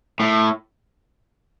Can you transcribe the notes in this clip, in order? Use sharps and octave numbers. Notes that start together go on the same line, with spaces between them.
A2